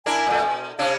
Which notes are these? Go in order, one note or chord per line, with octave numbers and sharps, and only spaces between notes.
D4 E4 A#4 G#5
A#2 A3
B2
C3 C#4 D4 F5